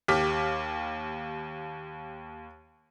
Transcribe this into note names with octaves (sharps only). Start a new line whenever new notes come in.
D#2 G4 D6 F6 B6